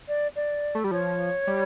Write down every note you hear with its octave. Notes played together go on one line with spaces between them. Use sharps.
D5
D5
A3
G3
F3 C#5
G3